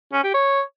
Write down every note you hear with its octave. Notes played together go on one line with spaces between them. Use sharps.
C#4
G4
C#5